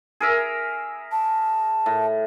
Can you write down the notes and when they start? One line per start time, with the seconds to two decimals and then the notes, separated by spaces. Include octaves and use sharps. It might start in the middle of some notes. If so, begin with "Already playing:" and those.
0.20 G#4 A#4 E5
1.12 A5
1.86 A2